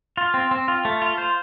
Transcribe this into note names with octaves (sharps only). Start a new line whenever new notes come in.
F4
C4
C4
F4
A3
F4
C5